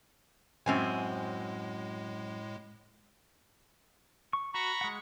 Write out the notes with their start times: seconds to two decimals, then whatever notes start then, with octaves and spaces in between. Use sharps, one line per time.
0.66 F#2 A2 G#3 C4 G#5
4.33 C#6
4.54 F#4 A#5 B5 C#6
4.81 G#3 F#5